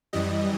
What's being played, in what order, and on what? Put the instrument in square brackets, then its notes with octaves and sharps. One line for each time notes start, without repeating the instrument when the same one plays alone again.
[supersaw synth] F#2 E3 G3 D#5